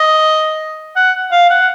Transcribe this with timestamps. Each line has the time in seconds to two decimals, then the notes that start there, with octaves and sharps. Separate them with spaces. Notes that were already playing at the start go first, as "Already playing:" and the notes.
Already playing: D#5
0.96 F#5
1.31 F5
1.50 F#5